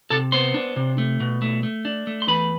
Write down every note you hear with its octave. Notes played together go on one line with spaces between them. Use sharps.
C3 A4 A5
B3 C5 C6
D4
C3
A3
B2
A3
A3
D4
A3
C6
E2 B4 B5